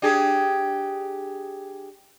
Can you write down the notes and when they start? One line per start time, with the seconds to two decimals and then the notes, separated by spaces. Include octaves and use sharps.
0.02 D4 G4 G#4